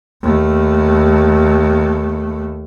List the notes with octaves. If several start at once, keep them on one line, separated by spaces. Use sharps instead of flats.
D#2 A3